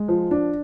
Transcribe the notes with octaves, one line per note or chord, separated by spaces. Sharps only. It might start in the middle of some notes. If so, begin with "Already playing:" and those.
Already playing: G#3
F3
D4